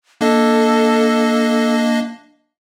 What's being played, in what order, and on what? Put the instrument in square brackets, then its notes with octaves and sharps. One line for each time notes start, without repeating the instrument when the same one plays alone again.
[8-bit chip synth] A#3 D4 D#5 [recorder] A4